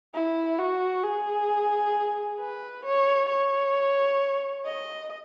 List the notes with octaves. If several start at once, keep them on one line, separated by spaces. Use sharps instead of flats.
E4
F#4
G#4
B4
C#5
C#5
D#5